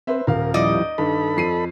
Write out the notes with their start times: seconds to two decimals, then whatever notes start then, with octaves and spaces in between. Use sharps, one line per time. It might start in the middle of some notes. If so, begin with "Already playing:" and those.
0.07 C4 B4 C5 E5
0.27 D#1 A#4 F5
0.54 F3 G3 D#4 E4 D5 D#5
0.98 G2 D#3 A4 B5
1.37 F2 C7 D#7